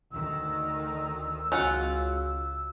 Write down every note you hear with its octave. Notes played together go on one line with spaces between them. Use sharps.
D2 D#3 E6
C#2 C#4 F4 F#4 F#5